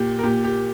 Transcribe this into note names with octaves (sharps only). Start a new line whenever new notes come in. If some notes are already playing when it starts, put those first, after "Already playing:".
Already playing: A#2 G4
A#4
A#2 G4
G4